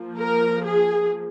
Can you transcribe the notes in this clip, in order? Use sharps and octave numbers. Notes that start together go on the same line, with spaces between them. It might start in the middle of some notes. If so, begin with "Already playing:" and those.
Already playing: F3 A#3
A#4
G#4